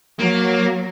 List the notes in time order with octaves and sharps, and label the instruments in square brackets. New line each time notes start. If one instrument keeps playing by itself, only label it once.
[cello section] F#3 [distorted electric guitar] A#3